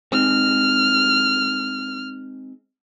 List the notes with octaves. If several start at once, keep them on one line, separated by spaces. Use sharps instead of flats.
G#3 C4 D#4 F6